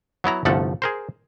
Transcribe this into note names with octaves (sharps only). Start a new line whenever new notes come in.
F#3 B3 E4 A#5
G1 C2 F3 A3 A4 F#5
G#4 A#4 C5